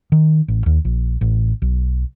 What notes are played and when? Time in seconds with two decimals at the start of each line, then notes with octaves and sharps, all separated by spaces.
0.12 D#3
0.48 A1
0.66 D#2
0.85 A#1
1.21 A1
1.62 B1